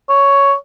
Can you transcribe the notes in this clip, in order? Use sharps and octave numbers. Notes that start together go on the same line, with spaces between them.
C#5